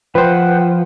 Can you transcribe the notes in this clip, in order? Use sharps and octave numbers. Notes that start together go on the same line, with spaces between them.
F3 B4 C5 F#5 G5